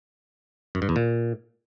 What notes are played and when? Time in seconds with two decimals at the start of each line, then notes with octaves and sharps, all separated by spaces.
0.75 F#2
0.82 G2
0.89 E2
0.96 A#2